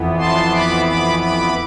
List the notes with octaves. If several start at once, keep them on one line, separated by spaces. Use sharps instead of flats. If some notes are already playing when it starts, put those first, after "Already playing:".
Already playing: F2 E3 B3
A5 C6
B5 D6
B5 D6
B5 D6